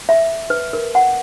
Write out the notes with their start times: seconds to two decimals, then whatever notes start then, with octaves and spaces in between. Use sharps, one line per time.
0.09 E5
0.50 B4
0.73 A#4
0.95 F#5